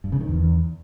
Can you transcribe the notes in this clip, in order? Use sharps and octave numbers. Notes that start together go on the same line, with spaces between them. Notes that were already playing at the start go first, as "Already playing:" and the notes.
G2
C#3
D#3
E2